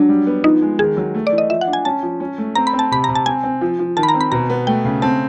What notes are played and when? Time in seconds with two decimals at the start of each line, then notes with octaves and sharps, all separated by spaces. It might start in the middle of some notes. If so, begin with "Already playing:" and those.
Already playing: F#3 D4
0.09 G3
0.27 B3
0.44 F3 D#4
0.62 G#3
0.79 D#3 G#4
0.97 F#3
1.14 A3
1.27 D5
1.32 E3
1.38 D#5
1.50 F3 E5
1.61 F#5
1.67 D4
1.73 G#5
1.85 C#4 A5
2.03 F3
2.20 C#4
2.38 A3
2.55 C4 A#5
2.67 B5
2.73 C4
2.79 A5
2.91 C3 B5
3.04 C3 A#5
3.15 A5
3.26 C4 G#5
3.44 C4
3.61 F3
3.79 F3
3.97 D#3 A5
4.03 B5
4.09 A#5
4.14 C4
4.21 B5
4.32 B2 A#5
4.50 B3
4.67 A3 G5
4.85 C#3
5.02 C4 A5